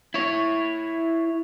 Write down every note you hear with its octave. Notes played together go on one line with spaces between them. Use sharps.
E4 C#5